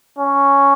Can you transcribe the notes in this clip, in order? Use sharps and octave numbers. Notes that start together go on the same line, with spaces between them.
C#4